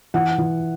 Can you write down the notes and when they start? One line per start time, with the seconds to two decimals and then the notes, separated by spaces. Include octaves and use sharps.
0.14 E3 F#5
0.38 E3